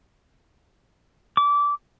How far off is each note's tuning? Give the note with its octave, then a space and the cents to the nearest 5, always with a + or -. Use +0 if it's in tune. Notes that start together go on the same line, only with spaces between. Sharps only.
D6 -20